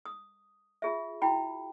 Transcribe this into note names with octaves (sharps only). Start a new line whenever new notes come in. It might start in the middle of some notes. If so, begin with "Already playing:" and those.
D#6
F4 G#4 E5
E4 F#4 G5 B5